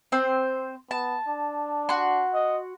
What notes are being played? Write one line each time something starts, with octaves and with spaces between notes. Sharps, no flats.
C4 C5
B3 A5
D4
F#4 C6
D#5